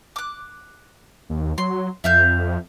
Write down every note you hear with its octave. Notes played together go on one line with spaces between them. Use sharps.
D6 F#6
D#2
F#3 C6
F2 E5 F5 G6